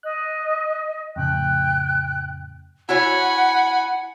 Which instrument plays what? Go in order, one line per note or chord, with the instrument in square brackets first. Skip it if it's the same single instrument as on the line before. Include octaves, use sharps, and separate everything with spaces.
[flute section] D#5 [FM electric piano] F#6
[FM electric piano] F2 A2 C#3 [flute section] G5 F#6
[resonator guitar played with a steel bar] E4 F#4 C#5 [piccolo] F#5 [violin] G#5 B5